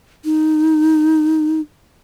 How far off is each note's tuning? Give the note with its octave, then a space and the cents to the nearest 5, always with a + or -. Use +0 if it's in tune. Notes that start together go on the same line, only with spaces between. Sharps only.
D#4 +0